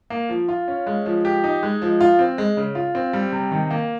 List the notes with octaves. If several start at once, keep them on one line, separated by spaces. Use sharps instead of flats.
A#3
F3
F4
C#4
G#3
F3
G4
D#4
G#3
F3
F4
C4
G#3
C#3
F4
C4
G3
C3
D#3
A#3